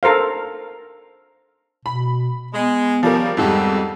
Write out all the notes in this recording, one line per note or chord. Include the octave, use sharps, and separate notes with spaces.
A4 A#4 C5 F5
B2 B5
G#3 B3
C#3 F3 G3 A#4
F2 G#2 D#3 G3 G4 A4